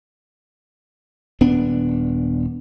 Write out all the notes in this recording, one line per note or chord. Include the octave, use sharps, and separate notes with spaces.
D#1 B3 D4